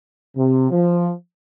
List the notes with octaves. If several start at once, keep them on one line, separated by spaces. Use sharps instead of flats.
C3
F3